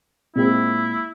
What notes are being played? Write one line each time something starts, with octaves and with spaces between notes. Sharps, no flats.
A#2 G#3 C4 E4